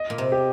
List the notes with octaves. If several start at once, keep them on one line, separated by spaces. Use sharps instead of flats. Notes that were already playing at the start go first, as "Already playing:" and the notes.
Already playing: D#5
A#2
C3
G4